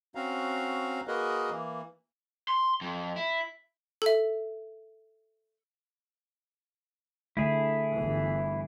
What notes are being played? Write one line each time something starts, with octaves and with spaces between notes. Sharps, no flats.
C4 C#4 F#4 F5 A#5
A#3 F#4 G#4 A#4 B4 D#5
E3 A#3
C6
F2
E4
A4 E5
D3 A3 E4 G#4
G1 E3